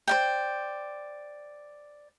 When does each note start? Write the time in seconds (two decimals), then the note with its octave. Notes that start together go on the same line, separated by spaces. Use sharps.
0.07 C5 D5 G5